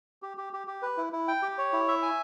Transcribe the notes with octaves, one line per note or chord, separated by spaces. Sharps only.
G4
G4
G4
G4
B4
E4
E4
G5
G4
C#5
E4
E5
G#5